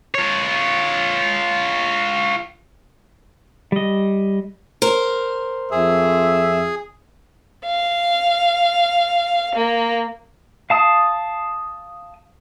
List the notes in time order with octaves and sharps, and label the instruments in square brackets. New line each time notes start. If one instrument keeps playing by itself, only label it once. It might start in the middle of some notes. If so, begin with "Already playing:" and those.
[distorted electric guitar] F4 C#5
[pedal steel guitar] G3 D#5
[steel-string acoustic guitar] A#4 C5
[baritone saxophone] F2 [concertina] G#4 [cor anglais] E5
[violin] F5
A#3
[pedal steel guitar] F5 A5 D#6